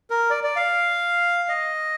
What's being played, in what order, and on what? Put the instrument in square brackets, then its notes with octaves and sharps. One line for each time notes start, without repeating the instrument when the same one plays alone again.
[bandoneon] A#4
D5
D5
F5
D#5